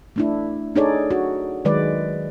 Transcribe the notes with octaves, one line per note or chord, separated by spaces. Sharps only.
A3 D4 E4
D4 D#4 G#4 A4 C#5 D5
F#4
D#3 F#3 G#3 B4 D5